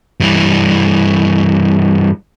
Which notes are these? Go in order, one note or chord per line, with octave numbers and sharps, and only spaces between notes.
G2 E3